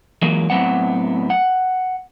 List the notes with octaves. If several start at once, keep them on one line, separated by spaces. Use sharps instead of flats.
E3 F#3 G#3 A#3 F4
A2 F#3 B3 C4 F#5
F#5